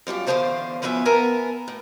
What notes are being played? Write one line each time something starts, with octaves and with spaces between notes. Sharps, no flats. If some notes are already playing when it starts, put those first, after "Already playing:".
F#2 G3 F4 G4
E2 D3 G3 C5 F5 A5
F#2 F3 B3 B4 E5 G#5
B3 A#4 E5 G#5 A5
A2